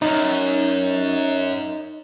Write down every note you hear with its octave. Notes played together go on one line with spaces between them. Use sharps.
F#2 D#4